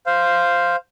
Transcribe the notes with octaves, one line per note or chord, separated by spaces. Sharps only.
C5 F5